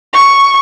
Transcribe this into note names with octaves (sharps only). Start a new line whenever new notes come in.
C#6